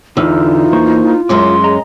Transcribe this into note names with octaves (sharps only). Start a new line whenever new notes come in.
E2 D3 D#4 F4 E6 F6
A#3 C5 C#6
F#2 G#3 C#4 C6 D6
G#4 D#5 A#5